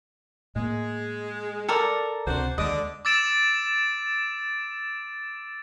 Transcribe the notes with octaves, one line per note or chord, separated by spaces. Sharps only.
A2 G#3 A#3
A4 A#4 D5
C#2 C3 D4 F#4 C5
D#2 D3 G#3 D5 D#5
D6 E6 A6 D7 E7